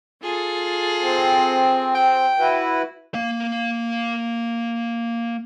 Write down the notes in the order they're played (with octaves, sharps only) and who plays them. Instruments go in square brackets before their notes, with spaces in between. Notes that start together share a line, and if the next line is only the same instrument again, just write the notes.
[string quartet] F4 G#4 A4
[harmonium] C4
[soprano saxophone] G5
[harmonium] E4 F#4 B4
[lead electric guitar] A#3 F5